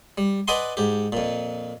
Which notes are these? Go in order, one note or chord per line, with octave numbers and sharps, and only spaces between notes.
G3
B4 D5 D#5 F#5 G#5 C6
G#2 G4
F2 A#2